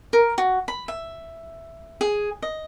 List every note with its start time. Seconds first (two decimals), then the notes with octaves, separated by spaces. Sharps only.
0.13 A#4
0.38 F#4
0.68 B5
0.88 E5
2.01 G#4
2.42 D#5